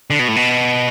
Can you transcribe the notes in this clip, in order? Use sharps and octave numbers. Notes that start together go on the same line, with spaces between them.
D3
B2
A2
B2